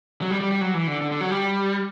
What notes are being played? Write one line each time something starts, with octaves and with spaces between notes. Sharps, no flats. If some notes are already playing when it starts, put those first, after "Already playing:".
F#3
G3
G3
G3
F#3
E3
D3
D3
D3
F#3
G3